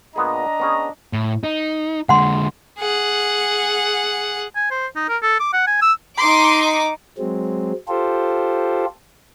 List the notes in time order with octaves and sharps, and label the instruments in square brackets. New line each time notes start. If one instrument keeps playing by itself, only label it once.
[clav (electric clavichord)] A#2 B3 G#4 [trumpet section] D4 D#5 A#5
[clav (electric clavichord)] B3 C#4 G#4
[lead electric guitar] A2
D#4
[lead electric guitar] D3 G#3 [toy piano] F#5 C6
[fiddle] G#4 F#5
[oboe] G#5
C5
D#4
A#4
A4
D6
F#5
G#5
E6
[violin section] D#4 D6 [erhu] C6
[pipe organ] F#3 G#3 C4
F4 G4 A4 C5